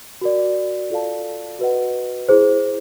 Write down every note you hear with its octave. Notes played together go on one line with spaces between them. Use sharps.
F#4 A#4 D5
F4 A4 D5 F5 A5
F#4 B4 D#5 F#5
E4 G#4 C5